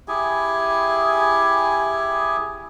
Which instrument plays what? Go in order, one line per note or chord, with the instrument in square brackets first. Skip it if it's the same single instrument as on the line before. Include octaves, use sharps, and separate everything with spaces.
[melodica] E4 G4 G#4 G#5